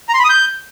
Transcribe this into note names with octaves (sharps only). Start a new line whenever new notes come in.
A#5
C6
B5
D#6
G6